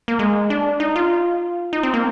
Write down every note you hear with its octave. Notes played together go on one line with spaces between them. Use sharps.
A#3
G#3
D4
D#4
F4
D#4
C4
A#3